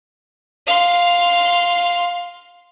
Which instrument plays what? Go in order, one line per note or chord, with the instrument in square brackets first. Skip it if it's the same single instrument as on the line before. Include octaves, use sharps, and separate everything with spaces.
[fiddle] F5 C6